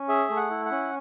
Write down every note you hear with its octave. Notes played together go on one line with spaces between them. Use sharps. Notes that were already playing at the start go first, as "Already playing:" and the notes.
Already playing: C#4
G#4 E5
A3
F#5
E4
F#5
C#4